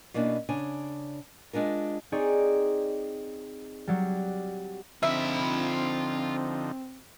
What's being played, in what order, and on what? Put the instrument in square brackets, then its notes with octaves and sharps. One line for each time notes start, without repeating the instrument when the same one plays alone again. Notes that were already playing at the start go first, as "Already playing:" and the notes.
[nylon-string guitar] B2 A#3 C#4 D4 E4
C#3 D4 C#5 G#5
G#3 D4 F4 A#4
[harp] C4 D#4 G#4 C#5 D5
F#3 G3
[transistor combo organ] D3 F3 D#4 [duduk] C4 [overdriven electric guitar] F4 B5 [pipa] E5